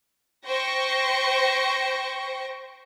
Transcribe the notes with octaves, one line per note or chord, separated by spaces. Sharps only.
C5 G5 C#6 A#6